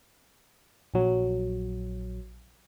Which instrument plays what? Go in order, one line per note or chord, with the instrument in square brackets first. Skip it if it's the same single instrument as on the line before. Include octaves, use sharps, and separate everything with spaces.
[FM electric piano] A#1 F#3